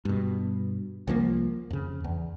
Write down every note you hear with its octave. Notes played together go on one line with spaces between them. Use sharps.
G2 B2
C2 F3 G#3 A#3
F2 C#3
E2